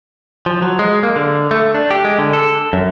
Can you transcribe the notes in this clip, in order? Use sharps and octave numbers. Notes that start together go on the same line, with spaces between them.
F3
F#3
G#3
A#3
D3
A3
D4
G4
G#3
D3
A4
F#2